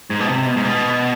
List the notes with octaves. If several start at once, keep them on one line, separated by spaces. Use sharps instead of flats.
G#2
B2
C3
B2
G#2
B2